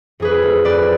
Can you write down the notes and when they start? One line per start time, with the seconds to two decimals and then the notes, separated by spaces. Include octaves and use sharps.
0.20 F2 G#4 B4
0.43 A3
0.64 F2 B4 D5